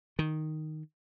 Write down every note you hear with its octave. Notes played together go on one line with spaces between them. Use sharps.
D#3